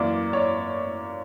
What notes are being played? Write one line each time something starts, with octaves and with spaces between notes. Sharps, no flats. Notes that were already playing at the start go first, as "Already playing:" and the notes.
Already playing: F#2 E3 A#3 D5
C#5
D5